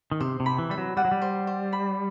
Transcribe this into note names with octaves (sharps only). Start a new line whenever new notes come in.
D#3
C3 C5
C3
B5
E3
G3 B5
F#3
G3 F#5
F#3
G3
C5
C5
B5